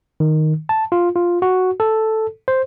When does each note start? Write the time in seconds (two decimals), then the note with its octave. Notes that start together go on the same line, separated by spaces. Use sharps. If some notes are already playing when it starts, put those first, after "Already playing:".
0.20 D#3
0.69 A5
0.92 F4
1.16 F4
1.42 F#4
1.80 A4
2.48 C5